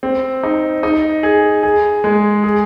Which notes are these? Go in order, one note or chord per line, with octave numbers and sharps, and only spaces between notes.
C4
D#4
D#4
G#4
G#4
G#3
G#4